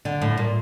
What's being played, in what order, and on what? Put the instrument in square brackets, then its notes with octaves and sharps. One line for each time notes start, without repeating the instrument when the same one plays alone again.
[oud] D3
A2
A#2